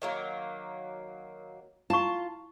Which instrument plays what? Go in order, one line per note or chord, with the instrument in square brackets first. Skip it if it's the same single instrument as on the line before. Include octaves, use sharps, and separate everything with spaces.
[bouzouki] D#3 F#3 A#3
[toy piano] E4 C#6 [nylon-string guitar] F4 [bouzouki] A5